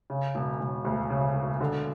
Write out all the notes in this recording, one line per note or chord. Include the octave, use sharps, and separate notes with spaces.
C#3
E1
E1
D2
C#3
E1
D3